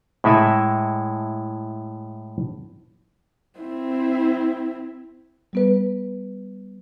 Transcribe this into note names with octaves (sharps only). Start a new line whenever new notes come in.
A2 G#3 E4 A4 G#5
C4 E4
G3 B3 B4